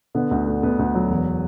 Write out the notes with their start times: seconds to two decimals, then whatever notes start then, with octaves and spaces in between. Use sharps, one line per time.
0.15 D3 B3
0.31 D2
0.46 A3
0.63 D2 B3
0.79 D2
0.95 F#3
1.10 E1